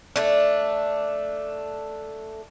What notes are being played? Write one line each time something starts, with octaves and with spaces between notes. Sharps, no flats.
A3 D4